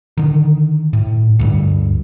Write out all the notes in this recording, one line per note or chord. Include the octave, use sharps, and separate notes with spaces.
D3 D#3
A2
D2 G2